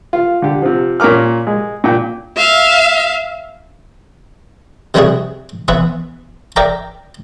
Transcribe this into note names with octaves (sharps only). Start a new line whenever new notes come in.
F4
D3 G4
C3 F3
A#2 C#4 A#4 D6 F6
G#3
A#2 G5
E5 F5
C3 D#3 G3 E4 F#4 G#4
E3 B3 B4 E5
A#4 D5 E5 G5 A#5